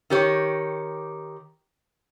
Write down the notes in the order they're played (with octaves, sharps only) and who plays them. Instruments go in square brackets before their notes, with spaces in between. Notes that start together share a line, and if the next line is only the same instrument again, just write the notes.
[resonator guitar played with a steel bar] D#3 G4 C#5